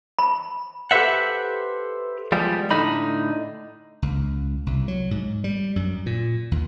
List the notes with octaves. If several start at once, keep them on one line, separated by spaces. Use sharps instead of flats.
B5
G4 A4 B4 C5 E5 F#5
F3 G3 G#3 B3
A2 D3 D#4 B5
C#2
C2
F#3
G#2
G3
F#2
A#2
D#2